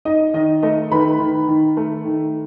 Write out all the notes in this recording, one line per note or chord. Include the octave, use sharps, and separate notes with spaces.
D#4 D#5
D#3 D#5
A3 D#5
D#3 B4 B5
D#3
D#3
A3
D#3